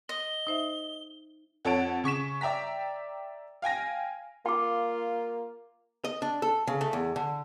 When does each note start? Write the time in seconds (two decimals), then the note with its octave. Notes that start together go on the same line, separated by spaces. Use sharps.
0.09 D#5 G7
0.47 D#4 C5 E5
1.65 F2 A4 C#5 F#5 D7
2.04 C#3 C#6 B6 E7
2.41 D5 E5 G5 A#5 B6
3.62 F5 G5 G#5 A#6
4.46 A#3 F4 G5 D6
6.05 D#5
6.22 D4
6.42 A4
6.67 C#3
6.81 A3
6.93 E2
7.16 D3